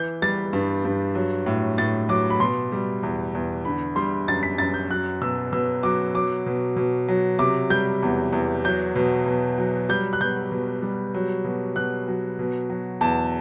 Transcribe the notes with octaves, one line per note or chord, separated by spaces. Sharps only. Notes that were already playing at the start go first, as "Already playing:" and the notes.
Already playing: E3 G6
G3 A6
G2
G2
F#3
A2
A2 A6
F#3 D6
B5
B2 C6
G3
E2
E2
D3 B5
G3 C6
F#2 A6
B6
F#2 A6
G6
F#3 F#6
B2 E6
B2 E6
F#3 D6
F#3 D6
B2
B2
F#3
C3 D6
G3 G6
E2
E2
F#3 G6
B2
B2
F#3
G3 G6
F#6
B2 G6
B2
G3
F#3
B2
B2 F#6
F#3
B2
F#3
E2 A5